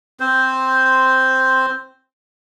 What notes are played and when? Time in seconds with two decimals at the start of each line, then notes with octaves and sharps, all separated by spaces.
0.20 C4 C5